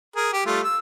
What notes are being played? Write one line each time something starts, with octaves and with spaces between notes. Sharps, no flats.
G#4 A#4
G4
G3 A3 F4
E6